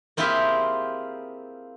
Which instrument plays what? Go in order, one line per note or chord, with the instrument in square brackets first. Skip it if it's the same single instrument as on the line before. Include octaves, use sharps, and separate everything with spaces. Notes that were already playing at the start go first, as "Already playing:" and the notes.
[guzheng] A#3 C4 E4 F4 G4 G#4